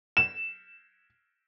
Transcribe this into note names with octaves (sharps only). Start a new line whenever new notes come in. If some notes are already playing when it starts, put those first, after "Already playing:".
E7